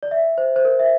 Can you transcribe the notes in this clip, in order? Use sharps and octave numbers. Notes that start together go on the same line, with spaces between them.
D5
E5
C5
C5
A#4
E5